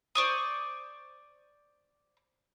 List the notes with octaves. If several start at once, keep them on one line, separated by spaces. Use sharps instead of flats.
C5 D5 C#6 D#6